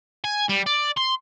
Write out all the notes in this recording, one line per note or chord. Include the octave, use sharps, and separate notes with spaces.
G#5
G3
D5
C6